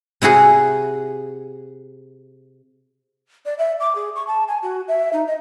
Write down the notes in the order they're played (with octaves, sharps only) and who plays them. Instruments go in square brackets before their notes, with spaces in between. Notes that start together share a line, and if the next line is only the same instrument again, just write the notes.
[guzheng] C3 E4 F#4 G#4
[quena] D5
E5
D6
G#4
C#6
A5
G#5
F#4
E5
D#4
D#5